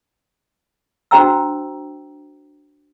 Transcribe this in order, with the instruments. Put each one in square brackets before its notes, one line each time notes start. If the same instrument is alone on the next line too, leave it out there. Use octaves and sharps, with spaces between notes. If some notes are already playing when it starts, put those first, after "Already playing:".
[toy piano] D4 F#4 C5 G5 A#5 E6